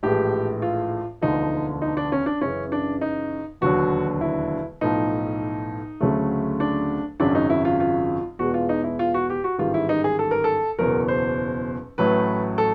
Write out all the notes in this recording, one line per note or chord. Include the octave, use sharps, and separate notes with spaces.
A#1 A2 E3 G#3 G4
F4
E1 D2 D3 F3 D#4
D#4
D4
C#4
D4
F#2 C#3 E3 C#4
D4
D#4
E1 D#2 D3 F#3 F#4
E4
B1 A2 F3 D#4
D2 C#3 F#3 A3
D4
G#1 F#2 C#3 F#3 D4
D#4
E4
F4
F4
E2 B2 G#3 F#4
F4
D#4
E4
F4
F#4
G4
F#4
A1 G#2 D#3 G3 F4
E4
D#4
G#4
A4
A#4
A4
F#1 E2 B2 F#3 A#4
C5
A1 A2 F#3 A3 B4
A4